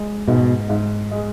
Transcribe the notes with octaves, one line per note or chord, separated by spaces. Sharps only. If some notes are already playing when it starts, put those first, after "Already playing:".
Already playing: G#3
G#2 B2
G#2
G#3